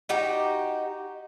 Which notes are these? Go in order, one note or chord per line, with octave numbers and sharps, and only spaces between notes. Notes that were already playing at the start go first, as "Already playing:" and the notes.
D#4 F#4 G4